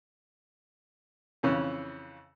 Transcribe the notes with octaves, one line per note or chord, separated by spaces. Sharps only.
F2 C#3 E3 C#4